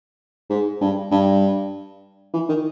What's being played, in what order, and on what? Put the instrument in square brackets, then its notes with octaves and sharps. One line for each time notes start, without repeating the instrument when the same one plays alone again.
[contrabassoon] G#2
G2
G2
E3
D#3